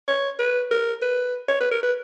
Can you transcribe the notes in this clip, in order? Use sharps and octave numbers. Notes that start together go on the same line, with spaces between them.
C#5
B4
A#4
B4
C#5
B4
A#4
B4